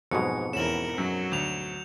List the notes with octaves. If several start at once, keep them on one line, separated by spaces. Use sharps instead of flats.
F2 G#2 B2 F#3 G#3 C#7
E2 C#4 A#4 E7 F#7
F#2 F#3
D2 G6 F7